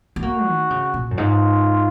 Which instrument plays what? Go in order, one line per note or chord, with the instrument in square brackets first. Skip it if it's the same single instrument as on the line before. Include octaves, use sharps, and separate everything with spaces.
[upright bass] B3
[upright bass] A#3 [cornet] F#4
[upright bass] D#3
C#3
A#2
F#2
[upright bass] G#2 [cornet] F4